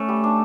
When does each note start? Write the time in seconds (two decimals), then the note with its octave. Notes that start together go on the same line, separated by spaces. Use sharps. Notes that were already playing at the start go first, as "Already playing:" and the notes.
Already playing: A3 C#4
0.09 G3
0.24 D4